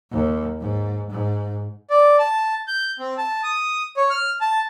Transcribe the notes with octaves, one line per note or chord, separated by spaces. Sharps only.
D#2
G#2
G#2
D5
A5
G6
C4
A5
D#6
C#5
F6
A5